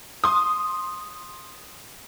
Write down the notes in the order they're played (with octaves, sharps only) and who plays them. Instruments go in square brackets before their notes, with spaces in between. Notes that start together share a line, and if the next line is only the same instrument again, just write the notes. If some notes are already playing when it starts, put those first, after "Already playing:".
[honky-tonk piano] C6 D#6